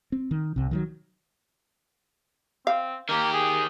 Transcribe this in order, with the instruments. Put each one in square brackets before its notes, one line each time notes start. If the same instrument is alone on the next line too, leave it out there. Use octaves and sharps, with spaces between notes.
[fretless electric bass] C4
D#3
C2 C3
D#3 F3 F#3
[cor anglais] C4 [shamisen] F5
[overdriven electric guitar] D#3 G4 [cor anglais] A#3
[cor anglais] G#4